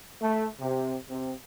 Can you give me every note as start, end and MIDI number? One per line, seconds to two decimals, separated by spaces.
0.20 0.46 57
0.60 0.94 48
1.09 1.31 48